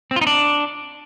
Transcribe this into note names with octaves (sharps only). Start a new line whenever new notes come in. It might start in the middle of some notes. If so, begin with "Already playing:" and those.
C4
F4
D#4
D4